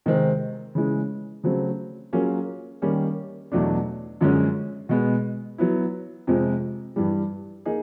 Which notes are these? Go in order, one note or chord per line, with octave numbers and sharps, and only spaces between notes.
C3 D#3 G#3 C4 D#4
C#3 E3 G#3
C#3 F#3 A3 C4
F#3 A#3 C#4 F4 G#4
D#3 G3 A#3 C#4
E2 B2 F#3 A3 D4
F#2 D3 F3 G#3 C#4
B2 G#3 B3
F#3 B3 E4
F2 C3 F3 G#3
G2 E3 G3
A#3 D#4 G#4